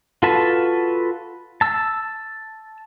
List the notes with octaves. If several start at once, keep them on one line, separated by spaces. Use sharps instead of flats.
F4 F#4 A4 B4 A5
A5 E6